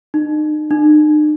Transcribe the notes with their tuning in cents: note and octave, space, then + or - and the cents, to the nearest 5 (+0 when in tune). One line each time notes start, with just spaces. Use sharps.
D#4 -35
D#4 -45